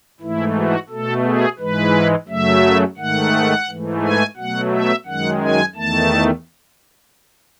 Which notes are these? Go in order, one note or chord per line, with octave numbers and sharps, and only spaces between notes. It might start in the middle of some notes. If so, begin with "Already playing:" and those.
G#2 E3 A3 E4
F#4
B2 A3 A4
G#4
G#2 E3 G#3 B4
F#2 C#3 F#3 A3 E5
G#2 D#3 A3 F#5
G#2 E3 A3
G#5
B2 F#3 A3 F#5
E5
F#2 D#3 G#3 F#5
G#5
E2 D#3 A3 A5